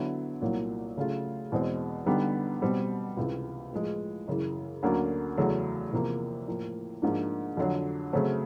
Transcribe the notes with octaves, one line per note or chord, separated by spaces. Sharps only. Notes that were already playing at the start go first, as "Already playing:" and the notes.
Already playing: D3 F#3 B3 E4
C2 A#2 F#3 A#3
C#3 F#3 A3 C#4 F4
E2 B2 G#3 C4
D3 G3 B3 D#4 G4
B2 G3 C4
C#2 C3 E3
A2 F3 G#3
F#2 C#3 E3
D2 D3 F#3 A#3 C#4
E2 C#3 F#3 A3
E2 C3 F3 A#3
A2 F3 A#3
G#2 F3 A#3 D4
F2 D3 F#3
C#3 F#3 A3 C4